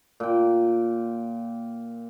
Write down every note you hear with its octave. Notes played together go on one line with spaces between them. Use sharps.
A#2 G5